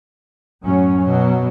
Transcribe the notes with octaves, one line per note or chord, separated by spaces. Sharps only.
F#2 A2 F#3 C#4
B2 F#3